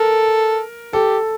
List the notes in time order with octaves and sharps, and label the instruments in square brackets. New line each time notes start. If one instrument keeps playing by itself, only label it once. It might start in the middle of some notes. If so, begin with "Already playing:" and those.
Already playing: [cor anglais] A4 [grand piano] A#4
[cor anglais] G4 [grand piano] A4